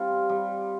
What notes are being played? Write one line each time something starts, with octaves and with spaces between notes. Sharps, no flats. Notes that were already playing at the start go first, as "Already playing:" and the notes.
Already playing: G3 C4 F4
G3